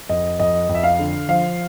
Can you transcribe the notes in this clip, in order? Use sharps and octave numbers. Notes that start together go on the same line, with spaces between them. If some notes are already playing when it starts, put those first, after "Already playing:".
F2 D#5
F2 D#5
F2
E5
F5
D3
F3 F5